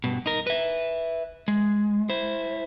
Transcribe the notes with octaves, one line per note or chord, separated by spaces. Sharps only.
G2 B2
D#4 A#4
B4 E5
G#3
E4 C5